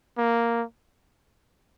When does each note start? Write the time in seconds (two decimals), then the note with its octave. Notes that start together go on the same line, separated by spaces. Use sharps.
0.18 A#3